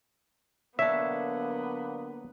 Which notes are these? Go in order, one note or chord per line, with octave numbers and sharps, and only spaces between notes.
D3 F#3 A#3 B3 D4 C#5 E5